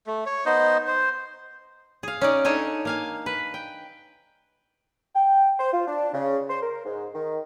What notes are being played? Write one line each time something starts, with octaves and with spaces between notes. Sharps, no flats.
A3
C#5
B3 D#4 C5 D#5
C5
G#4 F5
C#4 D#4 D5
D4 D#4 A4 C#5 G#5
A#3 F5 G#5
B4
G5
G5
C5
F4
D4
C#3
C5
A#4
G#2
D#3